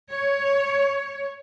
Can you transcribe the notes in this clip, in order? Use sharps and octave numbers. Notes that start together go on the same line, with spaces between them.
C#5